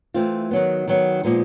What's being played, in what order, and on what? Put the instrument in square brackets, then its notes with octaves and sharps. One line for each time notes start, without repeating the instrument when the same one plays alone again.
[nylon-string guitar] E3 A3 C4 F4
D#3 F#3 B3
D#3 F#3 B3
A#2 F3 G#3 B3 D#4